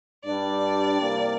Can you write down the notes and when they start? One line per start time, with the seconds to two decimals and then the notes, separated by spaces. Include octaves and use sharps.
0.24 G2 G3 D4 D5
1.00 C2 C3 A#3